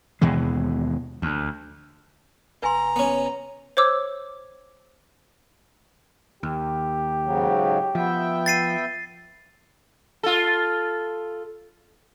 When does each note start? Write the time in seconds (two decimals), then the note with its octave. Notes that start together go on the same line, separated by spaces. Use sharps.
0.21 D#2 B2 E3 G#3
1.22 D2
2.62 F1 B4 G#5 A#5 C6
2.96 B3 C#4
3.77 C5 C#5 D6 E6
6.43 D#2 G4
7.25 G#2 C#3 F#3
7.95 F3 B3 E5 G5
8.46 A6 C7 D#7
10.23 F4 A4